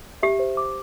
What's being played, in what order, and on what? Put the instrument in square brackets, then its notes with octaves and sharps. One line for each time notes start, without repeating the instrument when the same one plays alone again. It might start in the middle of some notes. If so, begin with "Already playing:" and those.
[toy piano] G4 [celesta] E5
[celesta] C5
D6